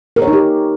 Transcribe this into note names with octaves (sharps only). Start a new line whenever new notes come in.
A#4
C#5
D#4
G4